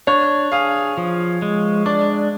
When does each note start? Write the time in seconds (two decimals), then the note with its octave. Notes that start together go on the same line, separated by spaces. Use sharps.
0.07 D4 C#5
0.52 G#4 F5
0.97 F3
1.42 G#3
1.86 D4 D5